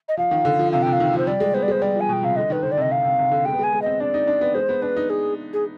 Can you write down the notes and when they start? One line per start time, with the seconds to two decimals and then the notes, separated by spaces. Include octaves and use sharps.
0.08 D#5
0.17 F3 F5
0.31 D#3
0.45 D3
0.59 F3
0.72 C3 F5
0.83 C3 G5
0.93 F5
1.00 D#3
1.13 F3 C5
1.27 G3 D5
1.40 G#3
1.54 B3 C5
1.63 D5
1.68 G#3 C5
1.82 G3 D5
1.96 F3 G#5
2.09 B2 G5
2.23 C3 F5
2.36 D3 D#5
2.50 D#3 B4
2.63 D3 C5
2.72 D5
2.77 C3 D#5
2.91 C3 F5
3.05 C3
3.19 C3
3.32 D3
3.45 G#3 G5
3.53 B3
3.59 G#3 G#5
3.73 G#3
3.82 C4 D#5
4.00 D4 D5
4.14 D#4
4.27 D4
4.41 B3
4.54 G#3 C5
4.69 B3
4.82 D4 B4
4.96 D#4
5.10 G#4
5.53 G#4